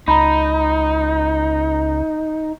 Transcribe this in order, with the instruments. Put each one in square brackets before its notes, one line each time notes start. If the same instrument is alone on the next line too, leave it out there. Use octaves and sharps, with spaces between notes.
[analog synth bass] C#2 [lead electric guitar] D#4 [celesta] A#5 B5